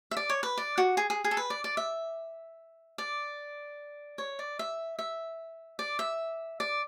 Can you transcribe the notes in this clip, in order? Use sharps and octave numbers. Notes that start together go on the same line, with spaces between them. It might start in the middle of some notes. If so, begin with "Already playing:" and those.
E5
D5
C#5
B4
D5
F#4
G#4
G#4
G#4
A4
B4
D5
D5
E5
D5
C#5
D5
E5
E5
D5
E5
D5